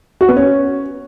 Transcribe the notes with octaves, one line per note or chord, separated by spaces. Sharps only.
F#4
B3
C#4